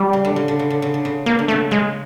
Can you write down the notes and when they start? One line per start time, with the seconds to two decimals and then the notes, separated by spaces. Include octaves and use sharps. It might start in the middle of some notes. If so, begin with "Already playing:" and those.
Already playing: G3
0.13 C#3
0.25 D3
0.36 C#3
0.48 D3
0.59 C#3
0.70 D3
0.82 C#3
0.94 D3
1.05 C#3
1.26 C#3 A#3
1.39 D3
1.48 A3
1.51 C#3
1.71 C#3 G#3